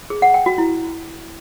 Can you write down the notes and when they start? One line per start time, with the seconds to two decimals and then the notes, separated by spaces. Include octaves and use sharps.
0.10 G#4
0.22 F#5
0.34 G5
0.46 F#4
0.58 E4